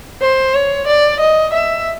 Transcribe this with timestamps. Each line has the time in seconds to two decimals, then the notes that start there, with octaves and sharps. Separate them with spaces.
0.22 C5
0.55 C#5
0.88 D5
1.20 D#5
1.53 E5